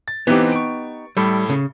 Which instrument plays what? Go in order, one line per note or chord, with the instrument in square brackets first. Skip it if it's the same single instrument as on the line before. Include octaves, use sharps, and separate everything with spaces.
[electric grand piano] A6
[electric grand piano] E3 C4 [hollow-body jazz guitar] B3 D#4 G4
[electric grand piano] C#6 D7
[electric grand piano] A2 A4 B5 [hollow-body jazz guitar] G3
[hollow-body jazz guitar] C#3